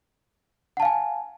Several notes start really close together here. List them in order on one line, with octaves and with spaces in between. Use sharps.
F#5 A5 F5 G#5